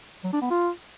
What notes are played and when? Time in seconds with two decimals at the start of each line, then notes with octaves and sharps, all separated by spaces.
0.24 F#3
0.33 D4
0.41 B3
0.50 F4